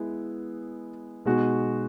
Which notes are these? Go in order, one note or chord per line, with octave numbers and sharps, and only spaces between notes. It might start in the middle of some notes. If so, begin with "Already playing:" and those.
Already playing: G#3 B3 E4
B2 G#3 D#4 F#4